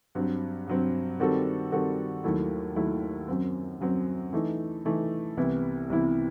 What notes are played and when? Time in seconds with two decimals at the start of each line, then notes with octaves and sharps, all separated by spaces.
0.15 G2 F#3 C4
0.67 G2 F#3 C4
1.20 D#3 G3 C4 F#4 A4
1.72 D#3 G3 C4 F#4 A4
2.24 D#2 D#3 F#3 A3 E4
2.76 D#2 D#3 F#3 A3 E4
3.28 F#2 F#3 C4
3.81 F#2 F#3 C4
4.33 E3 A3 D#4
4.85 E3 A3 D#4
5.37 C2 C3 E3 B3 E4
5.89 C2 C3 E3 B3 E4